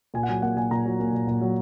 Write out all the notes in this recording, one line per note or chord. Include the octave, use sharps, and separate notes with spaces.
A#2 G#5
F#5
F#3 G#5
A#3 F#5
A#2 G#5
A#2 A#5
F#3
A#3
A#2
A#2
F#3